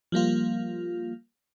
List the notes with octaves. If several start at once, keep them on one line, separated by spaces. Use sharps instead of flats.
F3 G3 A#3 F4